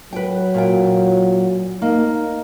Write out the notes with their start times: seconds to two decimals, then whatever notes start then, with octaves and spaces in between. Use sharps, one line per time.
0.13 F#3 B4 G5
0.54 A#2 F4 G5
1.82 A#3 D#4